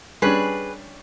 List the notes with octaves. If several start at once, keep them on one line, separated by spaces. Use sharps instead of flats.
G3 C#4 D4 G#4 B4